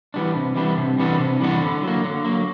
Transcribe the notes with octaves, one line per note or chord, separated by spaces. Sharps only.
E3 G3 B3 D4
C3
E3 G3 B3 D4
C3
E3 G3 B3 D4
C3
E3 G3 B3 D4
D3
F#3 A#3
D3
F#3 A#3